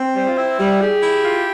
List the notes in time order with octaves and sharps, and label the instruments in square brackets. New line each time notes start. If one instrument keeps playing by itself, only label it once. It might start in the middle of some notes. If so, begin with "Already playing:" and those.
Already playing: [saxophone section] C4
[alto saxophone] G3 [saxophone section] C5
[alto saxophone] F4
[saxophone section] C4 [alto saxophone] E4
[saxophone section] G3
[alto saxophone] G4 [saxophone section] G#4
[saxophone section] E4
F4